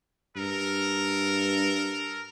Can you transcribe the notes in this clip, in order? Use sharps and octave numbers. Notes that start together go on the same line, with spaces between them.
G2 A4 A#4